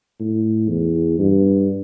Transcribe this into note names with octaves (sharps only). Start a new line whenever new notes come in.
A2
E2
G2